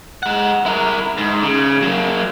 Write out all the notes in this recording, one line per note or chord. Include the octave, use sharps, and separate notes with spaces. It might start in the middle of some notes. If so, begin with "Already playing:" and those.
G#3 F#5
E4 A#4
G#2
C#3
F#3 A#3